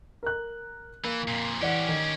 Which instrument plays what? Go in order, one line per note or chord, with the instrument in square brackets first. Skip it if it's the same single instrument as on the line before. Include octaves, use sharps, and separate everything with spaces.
[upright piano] A#4 F#6
[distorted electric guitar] E3 [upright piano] A#3
[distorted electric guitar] F2 A#2
[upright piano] E3 D5 F#5 [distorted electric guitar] C#4 G4
[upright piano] D#3